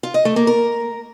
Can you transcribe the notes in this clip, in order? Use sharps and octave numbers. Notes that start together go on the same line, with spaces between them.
F4
D#5
A3
A#3
A#4